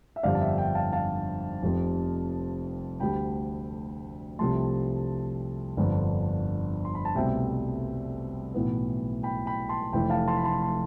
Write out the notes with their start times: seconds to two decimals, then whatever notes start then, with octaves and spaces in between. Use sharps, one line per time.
0.16 E5
0.23 G1 F2 D3 G3 D5 F5
0.35 A5
0.40 E5 G5
0.58 E5 G5
0.75 F5 A5
0.92 F5 A5
1.62 F1 F2 C3 F3 C4
3.00 D2 D3 G3 G5 B5
4.39 C2 C3 F3 A3 A5 C6
5.77 G1 F2 D3
6.85 C6
6.95 B5
7.05 A5
7.15 C2 B2 A3 C4 E5 G5
8.54 B1 A2 E3 B3
9.23 G5 B5
9.46 G5 B5
9.69 A5 C6
9.93 F1 F2 E3 A3 G5 B5
10.10 F5 A5
10.28 A5 C6
10.37 B5
10.44 A5 C6
10.62 A5 C6